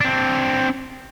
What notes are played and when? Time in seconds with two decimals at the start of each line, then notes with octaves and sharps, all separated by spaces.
0.01 C4 D4